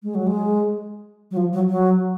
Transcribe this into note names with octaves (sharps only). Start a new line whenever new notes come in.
G#3
F#3
G#3
F#3
F3
F#3
F#3